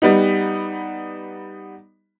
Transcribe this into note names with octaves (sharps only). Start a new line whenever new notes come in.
G3 B3 D#4